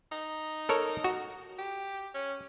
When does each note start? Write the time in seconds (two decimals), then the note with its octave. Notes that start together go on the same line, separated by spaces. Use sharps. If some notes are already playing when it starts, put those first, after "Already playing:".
0.12 D#4
0.69 A4 A#4 C#5
1.04 F#4
1.59 G4
2.14 C#4